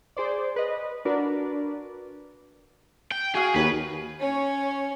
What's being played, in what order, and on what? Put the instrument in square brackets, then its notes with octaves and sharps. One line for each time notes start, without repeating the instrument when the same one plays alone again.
[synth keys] G#4 C5 D5
B4 D#5
D4 F#4 A#4 B4 D5
[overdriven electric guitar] G5
[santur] F#4 F5 [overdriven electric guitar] G#4
[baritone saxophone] D#2 [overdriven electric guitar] B4 [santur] C#5
[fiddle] C#4 C#5